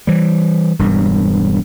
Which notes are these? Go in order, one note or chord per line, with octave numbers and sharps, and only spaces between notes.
E3 G3
E1 G2